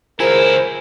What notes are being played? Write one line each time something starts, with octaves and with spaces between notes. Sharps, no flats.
C#2 E4 F4 G#4 A#4 C5 G#5